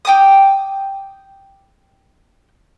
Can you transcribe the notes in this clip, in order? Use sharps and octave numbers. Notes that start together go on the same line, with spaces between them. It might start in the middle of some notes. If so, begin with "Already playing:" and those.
G5 G#5 D6 D#6